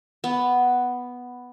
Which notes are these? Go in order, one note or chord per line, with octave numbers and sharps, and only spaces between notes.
B3